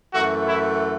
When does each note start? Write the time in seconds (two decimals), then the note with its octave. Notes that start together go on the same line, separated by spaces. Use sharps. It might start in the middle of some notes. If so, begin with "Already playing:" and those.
0.13 F#2 E3 A3 F#4
0.47 E4